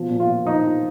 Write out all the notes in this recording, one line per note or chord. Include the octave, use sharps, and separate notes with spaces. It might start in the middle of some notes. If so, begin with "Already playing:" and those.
Already playing: B2 F3
A#2
F4
A#2
F3 D#4
F3